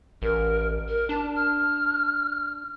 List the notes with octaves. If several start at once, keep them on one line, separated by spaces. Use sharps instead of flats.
A1 A#4
A#4
D4 A5
F6